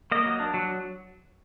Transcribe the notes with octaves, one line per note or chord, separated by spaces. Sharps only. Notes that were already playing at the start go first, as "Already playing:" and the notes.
A#3 D#5
F#3
D4
F#3